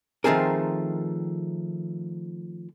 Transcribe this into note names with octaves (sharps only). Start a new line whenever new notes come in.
D#3 F3 A3 C4 G#4 A#4